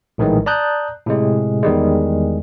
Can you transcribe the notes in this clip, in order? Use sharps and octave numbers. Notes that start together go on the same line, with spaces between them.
A#1 A2 D#3 E3 G#3
D5 A5 A#5 D#6 F#6 G6
A2 C3 G#3
E2 D#3 G3 G#3